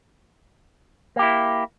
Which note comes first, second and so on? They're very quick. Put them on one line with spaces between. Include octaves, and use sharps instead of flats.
A#3 G4 E4